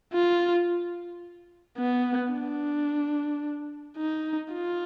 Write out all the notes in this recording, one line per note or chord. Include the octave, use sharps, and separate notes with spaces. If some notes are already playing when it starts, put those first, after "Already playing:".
F4
B3
D4
D#4
F4